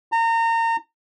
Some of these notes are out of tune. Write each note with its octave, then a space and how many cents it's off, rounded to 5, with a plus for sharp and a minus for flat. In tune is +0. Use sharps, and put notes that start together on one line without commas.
A#5 -30